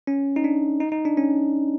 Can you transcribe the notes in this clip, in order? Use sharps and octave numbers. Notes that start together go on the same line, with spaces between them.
C#4
D#4
D4
D#4
D#4
D4
C#4